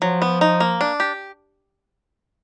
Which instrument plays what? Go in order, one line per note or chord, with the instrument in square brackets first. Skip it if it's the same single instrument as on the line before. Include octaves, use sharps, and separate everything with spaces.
[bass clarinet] F3 [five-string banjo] F#3
[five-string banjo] B3
D#4
A#3
D4
G4